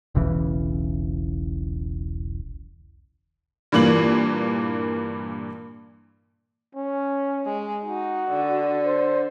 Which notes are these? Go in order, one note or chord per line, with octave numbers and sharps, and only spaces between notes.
E1 B1 C#3 E3
G2 A#2 E3 A#3 F#7
C#4
G#3
D#4 F#4
D3
C5